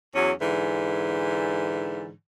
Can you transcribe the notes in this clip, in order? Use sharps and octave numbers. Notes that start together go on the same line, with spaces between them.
E2 F#3 C#4
G#2 D3 E3